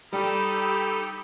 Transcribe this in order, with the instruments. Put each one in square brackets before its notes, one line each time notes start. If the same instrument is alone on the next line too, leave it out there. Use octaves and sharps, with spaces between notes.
[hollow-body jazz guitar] G3 [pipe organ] D#4 A4 [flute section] G4 D#6 E6 [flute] B5